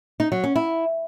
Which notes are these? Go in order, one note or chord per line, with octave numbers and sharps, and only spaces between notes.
D#4
F#3
C#4
E4